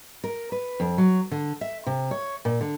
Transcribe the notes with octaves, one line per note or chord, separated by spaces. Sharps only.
A#4
B4
F2
F#3
D3
E5
C3
C#5
A#2
D3